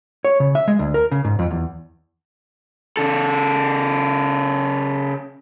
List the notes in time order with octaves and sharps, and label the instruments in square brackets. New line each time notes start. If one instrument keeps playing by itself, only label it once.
[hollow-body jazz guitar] C#5
C#3
E5
G#3
D2
A#4
C#3
G#2
F2
E2
[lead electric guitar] C#3 A4